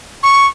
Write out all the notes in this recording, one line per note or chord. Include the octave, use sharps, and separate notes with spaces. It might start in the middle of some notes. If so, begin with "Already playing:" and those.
C#6